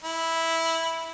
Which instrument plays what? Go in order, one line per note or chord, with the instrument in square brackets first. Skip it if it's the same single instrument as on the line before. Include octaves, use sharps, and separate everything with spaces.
[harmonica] E4